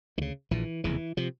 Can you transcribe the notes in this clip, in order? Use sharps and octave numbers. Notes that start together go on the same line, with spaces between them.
D2 C#3 D#3
A#1 A#2 E3
F1 E2 C#3 E3
C3 F3